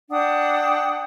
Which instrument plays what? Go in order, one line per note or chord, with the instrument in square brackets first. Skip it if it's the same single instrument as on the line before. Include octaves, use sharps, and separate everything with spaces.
[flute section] D4 F#5 G5 D#6